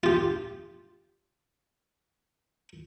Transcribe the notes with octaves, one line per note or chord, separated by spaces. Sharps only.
F4 G4